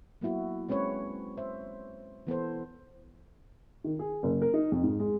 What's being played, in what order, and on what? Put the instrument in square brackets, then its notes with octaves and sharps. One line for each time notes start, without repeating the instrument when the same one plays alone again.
[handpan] F#3 A#3 B3 E4 F#4
G#3 C4 C#4 B4 C#5
C5 E5
E3 B3 A4 C5
[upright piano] D#3
G#4
F#1
A#4
D#4
F2
G#2
G#3